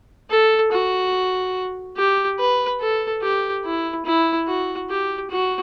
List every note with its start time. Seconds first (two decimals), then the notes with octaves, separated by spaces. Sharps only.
0.30 A4
0.72 F#4
1.97 G4
2.39 B4
2.80 A4
3.22 G4
3.65 E4
4.06 E4
4.47 F#4
4.89 G4
5.31 F#4